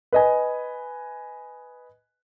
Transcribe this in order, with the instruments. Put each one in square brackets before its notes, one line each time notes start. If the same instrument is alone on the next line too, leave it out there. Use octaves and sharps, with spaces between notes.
[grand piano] B4 D#5 G#5